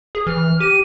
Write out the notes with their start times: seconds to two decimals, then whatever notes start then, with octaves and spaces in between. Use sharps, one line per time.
0.15 G#4
0.27 E3 F6
0.60 G4 D#7